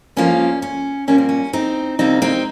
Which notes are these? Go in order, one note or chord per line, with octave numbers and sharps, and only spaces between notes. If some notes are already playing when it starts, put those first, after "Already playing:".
G2 F3 A#3 C#4
C#4
A#2 G3 A#3 C#4
C4
C#4
C4 D#4
C3 G3 A#3 C4 D#4
C4 D#4